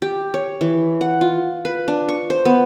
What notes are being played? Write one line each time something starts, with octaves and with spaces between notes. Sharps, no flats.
G4
C#5
E3
F#5
F4
B4
D4
C#6
C5
B3